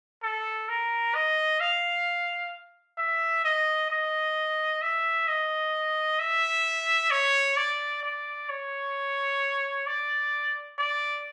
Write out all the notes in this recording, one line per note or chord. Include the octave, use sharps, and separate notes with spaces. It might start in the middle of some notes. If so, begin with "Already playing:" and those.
A4
A#4
D#5
F5
E5
D#5
D#5
E5
D#5
E5
C#5
D5
D5
C#5
D5
D5